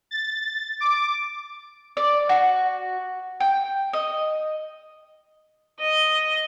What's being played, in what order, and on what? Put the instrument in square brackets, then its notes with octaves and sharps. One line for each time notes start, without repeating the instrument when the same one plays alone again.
[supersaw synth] A6
D6
[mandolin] D5
F#4
G5
D#5
[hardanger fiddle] D#5